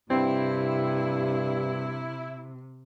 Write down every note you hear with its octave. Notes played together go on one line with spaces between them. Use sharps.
G2 C3 C4 E4